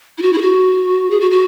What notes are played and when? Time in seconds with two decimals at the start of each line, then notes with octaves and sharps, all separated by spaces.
0.18 E4
0.22 F#4
0.33 E4
0.38 G#4
0.41 F#4
1.10 G#4
1.20 F#4
1.31 F#4